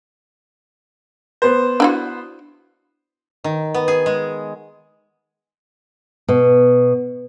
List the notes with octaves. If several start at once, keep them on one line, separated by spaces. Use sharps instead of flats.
B3 C5
D4 E4 F#4
D#3
B3
G#4
G#3
B2